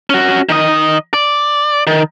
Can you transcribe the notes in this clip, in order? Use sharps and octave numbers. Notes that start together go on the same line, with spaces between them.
C#4 F#4
D#3 D#5
D5
D#3